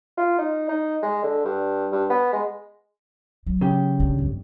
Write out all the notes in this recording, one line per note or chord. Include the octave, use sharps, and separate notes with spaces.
F4
D#4
D#4
G#3
D3
G2
G2
B3
G#3
F#3
C#3 G4
G#2 D3
G1 F2